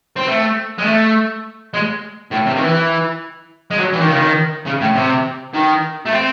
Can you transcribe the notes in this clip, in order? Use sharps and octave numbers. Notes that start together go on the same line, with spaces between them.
C4
A3
G#3
A3
G#3
A2
C3
D#3
E3
G#3
F#3
E3
D#3
C#3
D#3
C#3
A2
C3
D#3
A3
C4